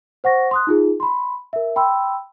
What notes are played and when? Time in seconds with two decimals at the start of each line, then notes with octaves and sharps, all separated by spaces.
0.24 C5 F#5 C#6 A#6
0.51 C6 D#6 F#6
0.67 D#4 F4 G#4
1.00 B5 C6
1.53 A#4 E5
1.76 G5 B5 C6 E6